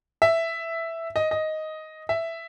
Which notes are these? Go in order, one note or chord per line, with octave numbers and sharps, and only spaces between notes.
E5
D#5
D#5
E5